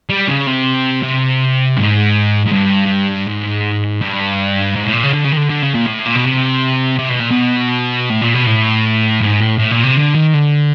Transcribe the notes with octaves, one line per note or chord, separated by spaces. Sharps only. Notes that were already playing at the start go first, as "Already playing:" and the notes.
G3
C#3
C3
C3
G#2
G#2
G2
G#2
G2
G#2
A2
A#2
C#3
D3
C#3
D#3
D3
D3
C#3
A#2
A2
A#2
B2
C3
C3
B2
A#2
B2
A2
A#2
B2
A2
G#2
A2
A2
A#2
C3
D3
D#3
D3